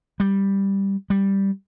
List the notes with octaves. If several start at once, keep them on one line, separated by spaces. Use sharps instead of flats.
G3
G3